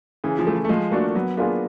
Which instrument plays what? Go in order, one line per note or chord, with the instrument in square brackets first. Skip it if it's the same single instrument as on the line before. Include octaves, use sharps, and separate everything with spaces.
[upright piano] C#3 [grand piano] E3
[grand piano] F3
[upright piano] E3 A3
[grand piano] A3
[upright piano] F3 [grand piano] G#3
[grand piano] A3 [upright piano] A#3 D4 F#4
[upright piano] F#3 [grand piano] B3
[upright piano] A#3 D4 F4 G#4 [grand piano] B3